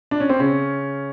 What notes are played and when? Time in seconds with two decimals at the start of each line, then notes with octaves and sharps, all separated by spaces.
0.11 D4
0.20 C#4
0.30 C4
0.39 C#3 C#4